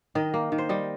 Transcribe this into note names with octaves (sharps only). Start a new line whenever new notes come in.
D#3 D#5
A#3
D#3
C5
G3 D#5